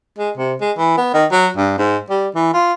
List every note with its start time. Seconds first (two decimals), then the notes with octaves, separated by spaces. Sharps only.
0.18 G#3
0.37 C3
0.60 G#3
0.77 E3
0.97 B3
1.14 D#3
1.32 F#3
1.57 G2
1.78 G#2
2.10 G3
2.35 E3
2.53 F4